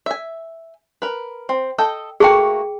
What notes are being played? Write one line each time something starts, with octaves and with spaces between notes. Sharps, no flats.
E5 G#5
A#4 B4
C4
A4 D#5 G5
A3 A#3 F#4 G#4 G5